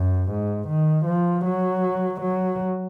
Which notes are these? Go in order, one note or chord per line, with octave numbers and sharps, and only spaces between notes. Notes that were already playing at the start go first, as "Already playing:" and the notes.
Already playing: F#2
G#2
D#3
F3
F#3
F#3